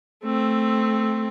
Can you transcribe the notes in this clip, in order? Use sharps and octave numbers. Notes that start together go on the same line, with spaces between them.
A3 C4